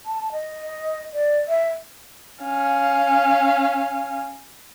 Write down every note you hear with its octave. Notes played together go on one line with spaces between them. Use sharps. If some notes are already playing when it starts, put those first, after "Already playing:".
A5
D#5
D5
E5
C#4 F5